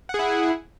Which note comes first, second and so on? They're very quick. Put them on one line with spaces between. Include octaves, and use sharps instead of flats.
F#5 G#4 E4